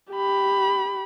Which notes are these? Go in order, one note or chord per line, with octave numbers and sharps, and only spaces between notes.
G4 B5